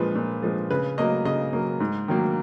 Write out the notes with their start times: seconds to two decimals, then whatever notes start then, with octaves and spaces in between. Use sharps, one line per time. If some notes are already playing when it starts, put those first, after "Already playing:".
Already playing: A#2 F3 G#3 B4
0.15 A#2
0.43 F3 G#3
0.71 C#3 B4
0.98 F#3 A#3 D#5
1.25 C#3 D#5
1.53 F#3 A#3
1.80 G#2
2.08 D#3 F#3 A#3